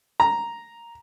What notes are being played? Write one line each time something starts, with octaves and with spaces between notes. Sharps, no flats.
A#5